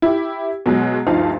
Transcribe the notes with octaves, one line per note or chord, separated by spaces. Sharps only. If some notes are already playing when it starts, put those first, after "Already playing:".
E4 G4
B2 F#3 G#3
D2 G2 F3 D#4 F5